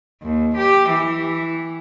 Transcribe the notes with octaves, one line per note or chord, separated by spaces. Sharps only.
D#2
G4
E3